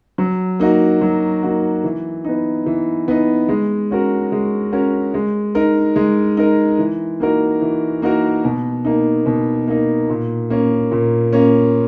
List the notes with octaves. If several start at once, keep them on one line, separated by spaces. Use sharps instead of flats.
F#3
A#3 D#4 F#4
F#3
A#3 D#4 F#4
E3
B3 D#4
E3
B3 D#4
G#3
C#4 F#4 A#4
G#3
C#4 F#4 A#4
G#3
D#4 A#4
G#3
D#4 A#4
E3
A#3 D#4 F#4 A#4
E3
A#3 D#4 F#4 A#4
B2
A#3 D#4
B2
A#3 D#4
A#2
A#3 C#4
A#2
A#3 C#4